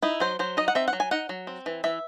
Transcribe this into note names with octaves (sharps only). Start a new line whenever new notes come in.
D#4 E4
F#3 C5
F#3 C5
D#4 D#5
F#5
C4 E5
F#5
F#3
G#5
D#4 F#5
F#3
C4
E3
E3 E5